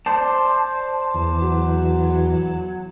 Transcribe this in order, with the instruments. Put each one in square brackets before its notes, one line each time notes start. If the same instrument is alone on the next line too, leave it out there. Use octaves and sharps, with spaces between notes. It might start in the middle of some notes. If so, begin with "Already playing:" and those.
[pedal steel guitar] C5 D5 [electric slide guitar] A5
[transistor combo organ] E2
[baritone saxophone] F#3